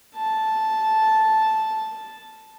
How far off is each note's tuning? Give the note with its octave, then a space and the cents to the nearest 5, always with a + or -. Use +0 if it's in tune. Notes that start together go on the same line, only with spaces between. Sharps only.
A5 -5